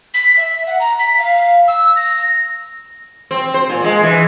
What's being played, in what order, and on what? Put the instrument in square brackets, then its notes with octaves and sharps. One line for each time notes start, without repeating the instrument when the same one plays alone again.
[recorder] B6
E5
F#5
A#5
B6
F5
E6
A#6
[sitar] C4
C5
A#2
G#3
E3